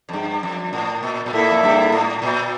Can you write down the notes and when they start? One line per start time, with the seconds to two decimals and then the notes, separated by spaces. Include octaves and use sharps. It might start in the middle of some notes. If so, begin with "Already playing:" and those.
0.09 F2
0.13 G2
0.43 F2
0.73 A2
1.03 A#2
1.26 A#2
1.33 A2 A#3 E4 A4 E5
1.51 F2
1.63 G2
1.92 A2
2.22 A#2